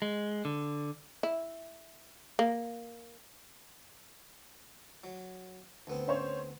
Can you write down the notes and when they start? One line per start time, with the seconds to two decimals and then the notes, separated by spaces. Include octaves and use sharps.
0.02 G#3
0.45 D3
1.23 E4
2.39 A#3
5.04 F#3
5.87 D2 B3 C4
6.08 C#4 C5 C#5